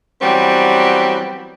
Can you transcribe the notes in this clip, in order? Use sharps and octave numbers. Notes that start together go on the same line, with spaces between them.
E3 F#3 G3 B3 C4